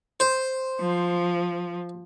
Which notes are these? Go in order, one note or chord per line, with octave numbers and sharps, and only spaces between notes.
C5
F3